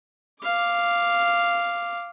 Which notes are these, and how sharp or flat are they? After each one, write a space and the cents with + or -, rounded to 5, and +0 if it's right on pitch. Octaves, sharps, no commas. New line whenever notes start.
F5 -5 D6 +0